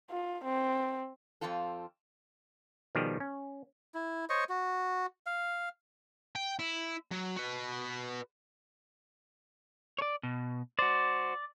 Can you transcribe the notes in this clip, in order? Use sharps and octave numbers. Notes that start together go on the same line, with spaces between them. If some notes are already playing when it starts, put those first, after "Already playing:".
F4
C4
F2 A#2 F3 C4 F4 A4
B2 D#3 F3 G3 G4 G#4
C#4
E4
C5 C#5 D#5 C#6
F#4
F5
G5
E4
F#3
F#4 B4
C#5 D5
B2
F#4 C5 D5